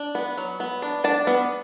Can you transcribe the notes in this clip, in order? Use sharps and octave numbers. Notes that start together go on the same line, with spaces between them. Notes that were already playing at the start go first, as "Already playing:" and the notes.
Already playing: D4
B3
F#3
B3
D4
D4 A5
B3